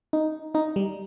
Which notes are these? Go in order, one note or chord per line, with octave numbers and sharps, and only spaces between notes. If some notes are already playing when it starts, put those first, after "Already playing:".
D#4
D#4
G3